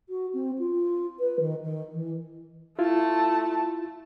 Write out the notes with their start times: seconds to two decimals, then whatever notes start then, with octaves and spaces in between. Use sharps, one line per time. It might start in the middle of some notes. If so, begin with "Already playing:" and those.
0.09 F#4
0.33 C4
0.58 F4
1.19 B4
1.39 D#3
1.63 D#3
1.92 E3
2.79 A3 E4 F4 A5